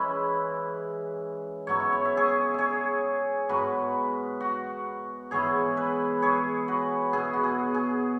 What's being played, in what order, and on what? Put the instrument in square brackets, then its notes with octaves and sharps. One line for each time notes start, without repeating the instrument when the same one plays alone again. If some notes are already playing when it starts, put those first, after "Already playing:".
Already playing: [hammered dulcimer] E3 G#3 C#4 E4 B4 E5
G#2 F#3 B3 E4 C#5
E5
C#5
E5
G#4 C#5
G#4 C#5 E5
G#2 F#3 B3 F#4 B4
F#4
G#2 E3 B3 E4 G#4 C#5
B4 E5
G#4 C#5
F#4 B4
B2 B3 E4 G#4
F#4
G#4
G#4